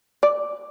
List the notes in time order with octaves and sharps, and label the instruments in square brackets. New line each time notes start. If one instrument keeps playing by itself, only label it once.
[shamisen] D5